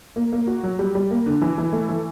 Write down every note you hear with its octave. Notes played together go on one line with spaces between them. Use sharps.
A#3
A#3
F#4
F#3
G3
G3
A#3
D3
E3
E3
A3
E3